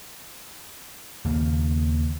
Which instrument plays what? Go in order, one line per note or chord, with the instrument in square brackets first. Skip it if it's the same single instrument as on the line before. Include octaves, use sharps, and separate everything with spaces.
[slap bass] D#2 C#3 A#3